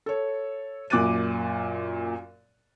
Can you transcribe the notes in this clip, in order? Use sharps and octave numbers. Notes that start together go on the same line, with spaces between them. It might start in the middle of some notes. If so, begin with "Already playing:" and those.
A4 C#5
F#2 A#2 D6 F#6 A6 D#7